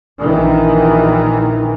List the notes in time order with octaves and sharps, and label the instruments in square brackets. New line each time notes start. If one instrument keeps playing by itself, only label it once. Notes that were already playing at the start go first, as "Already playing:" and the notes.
[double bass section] A#1 D#3 E3